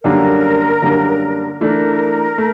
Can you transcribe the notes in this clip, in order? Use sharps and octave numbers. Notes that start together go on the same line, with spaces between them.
F#2 D3 G3 A#3 D4 A#4
F#2 D3 G3 A#3 D4
E3 A3 D4 A#4
A3